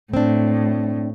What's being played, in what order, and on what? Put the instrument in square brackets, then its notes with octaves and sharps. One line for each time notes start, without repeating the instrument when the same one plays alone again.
[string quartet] A2 [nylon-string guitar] C4 D4